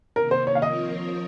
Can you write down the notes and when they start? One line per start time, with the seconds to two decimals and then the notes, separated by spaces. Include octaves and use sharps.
0.16 C3 D#3 A#3 A#4
0.31 C5
0.47 C#5
0.55 F5
0.62 F3 C4 F4 A#4 C#5 D#5